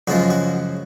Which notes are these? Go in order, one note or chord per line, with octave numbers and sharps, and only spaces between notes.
F#2 C#3 F3 G#3 F#4
F#4